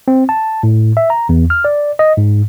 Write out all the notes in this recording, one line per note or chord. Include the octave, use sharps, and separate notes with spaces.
C4
A5
A2
E5
A#5
E2
F6
D5
D#5
G#2